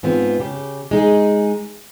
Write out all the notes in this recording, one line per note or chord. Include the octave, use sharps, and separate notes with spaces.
G#2 B3 C4 F4
C#3 G4
G#3 D#4 G#4